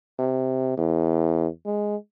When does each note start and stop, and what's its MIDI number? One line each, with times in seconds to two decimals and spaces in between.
0.19 0.75 48
0.77 1.48 40
1.66 1.96 56